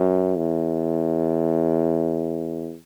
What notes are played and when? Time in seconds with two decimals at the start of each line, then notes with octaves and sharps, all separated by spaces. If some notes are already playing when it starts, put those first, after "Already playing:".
Already playing: F#2
0.37 E2